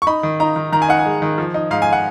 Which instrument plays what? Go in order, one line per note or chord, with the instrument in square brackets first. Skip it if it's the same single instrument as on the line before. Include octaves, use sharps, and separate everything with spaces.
[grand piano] C#6
D#4 B5
D#3
D#4 A#5
D#3
D#3 A#5
G#5
D#4 F#5
G#5
G#3
D#3
F3
D#4
G#2 F5
G#5
F#5